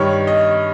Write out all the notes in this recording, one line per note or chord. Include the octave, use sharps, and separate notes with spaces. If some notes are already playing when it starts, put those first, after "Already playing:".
Already playing: G2 D#3 C#5
D#5